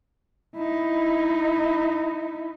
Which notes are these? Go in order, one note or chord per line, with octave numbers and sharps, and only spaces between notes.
D#4 E4